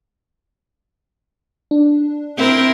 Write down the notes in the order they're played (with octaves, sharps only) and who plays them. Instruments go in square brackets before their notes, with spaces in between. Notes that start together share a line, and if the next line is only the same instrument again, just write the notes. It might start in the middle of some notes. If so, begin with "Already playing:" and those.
[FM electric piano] D4
[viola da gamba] C4 E4 A#4